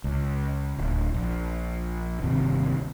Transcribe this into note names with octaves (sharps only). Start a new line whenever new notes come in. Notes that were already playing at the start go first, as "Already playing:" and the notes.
C#2
D1
A#1
G1 D#2 C3